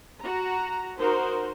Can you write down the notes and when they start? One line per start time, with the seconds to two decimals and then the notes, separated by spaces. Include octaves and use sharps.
0.22 F#4 A#5
0.98 D#4 F#4 A#4 C5